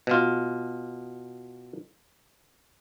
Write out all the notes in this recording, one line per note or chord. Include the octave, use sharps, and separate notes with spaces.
B2 F4